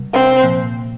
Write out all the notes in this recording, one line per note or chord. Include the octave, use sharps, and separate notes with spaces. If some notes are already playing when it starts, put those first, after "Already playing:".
Already playing: C3 G3
C4
A#2 F3 A#3